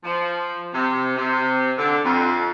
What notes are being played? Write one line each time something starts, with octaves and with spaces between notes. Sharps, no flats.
F3
C3
C3
D3
F2